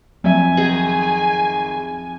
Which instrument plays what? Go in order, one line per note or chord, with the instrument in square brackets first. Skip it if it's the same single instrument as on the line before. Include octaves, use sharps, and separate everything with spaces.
[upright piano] F2 E5 [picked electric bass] F#3 [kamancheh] G#5
[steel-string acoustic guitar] D#3 G#4